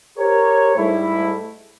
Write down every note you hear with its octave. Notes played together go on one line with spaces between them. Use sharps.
G4 A#4 C5 C#5
G#2 G3 A3 E4